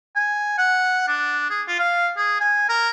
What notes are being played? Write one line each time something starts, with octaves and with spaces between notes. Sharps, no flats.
G#5
F#5
D4
G#4
F4
F5
G#4
G#5
A#4